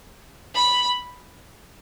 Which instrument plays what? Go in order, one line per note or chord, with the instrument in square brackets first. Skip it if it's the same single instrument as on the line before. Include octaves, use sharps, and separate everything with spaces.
[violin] B5